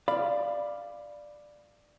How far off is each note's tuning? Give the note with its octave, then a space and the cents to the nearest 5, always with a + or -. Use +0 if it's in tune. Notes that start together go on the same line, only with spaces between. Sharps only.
D5 +10 F5 -5 B5 +0